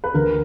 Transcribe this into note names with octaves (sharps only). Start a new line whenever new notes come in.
B4
D2 D3 A#4